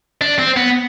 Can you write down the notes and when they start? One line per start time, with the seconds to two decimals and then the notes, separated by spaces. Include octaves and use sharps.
0.21 D4
0.39 C4
0.56 B3